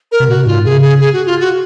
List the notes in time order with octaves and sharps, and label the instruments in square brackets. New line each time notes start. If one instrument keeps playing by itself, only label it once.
[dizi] A#4
[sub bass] C3
[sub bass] A#2 [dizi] F#4
[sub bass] C3
[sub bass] G#2 [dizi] F4
[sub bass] C3 [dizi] G#4
[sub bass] C#3
[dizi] G#4
G#4
F#4
F4
F#4